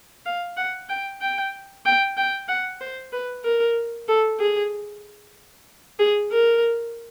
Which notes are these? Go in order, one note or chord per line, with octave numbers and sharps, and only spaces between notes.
F5
F#5
G5
G5
G5
G5
F#5
C5
B4
A#4
A4
G#4
G#4
A#4